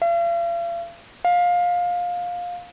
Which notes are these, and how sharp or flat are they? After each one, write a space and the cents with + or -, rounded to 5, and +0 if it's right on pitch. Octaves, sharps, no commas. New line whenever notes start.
F5 -40
F5 +20